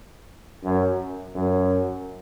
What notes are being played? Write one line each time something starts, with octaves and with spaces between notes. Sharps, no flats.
F#2
F#2